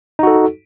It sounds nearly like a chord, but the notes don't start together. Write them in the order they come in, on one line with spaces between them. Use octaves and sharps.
D#4 F#4 A4